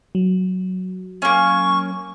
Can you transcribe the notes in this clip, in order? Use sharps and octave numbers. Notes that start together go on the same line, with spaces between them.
F#3
A#3 C#4 C#6